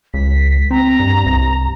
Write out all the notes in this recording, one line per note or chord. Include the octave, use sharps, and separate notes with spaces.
C#2 B6
C4 A#5
G2
C2